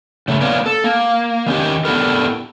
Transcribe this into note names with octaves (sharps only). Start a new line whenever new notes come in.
C#3 A3 A4
A#3 B3 C#4 D5
A4
A#3
D#3 C#4 G4
B3 D4 E4 G4 A4 A#4